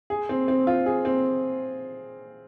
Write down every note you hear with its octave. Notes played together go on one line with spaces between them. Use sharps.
G#4
C4
C4
F4
G#4
C4